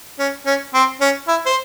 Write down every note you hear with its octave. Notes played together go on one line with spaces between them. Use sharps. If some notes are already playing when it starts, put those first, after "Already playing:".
C#4
C#4
C4
C#4
E4
C5